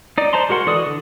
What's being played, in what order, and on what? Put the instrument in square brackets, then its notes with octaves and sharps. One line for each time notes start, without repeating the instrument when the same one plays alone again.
[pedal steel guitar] D#4 D5
C5 D5 A5 A#5 C6
G#3 F#4 A#4 F#5 C6
E3 F#4 A4 D5 D#6
D3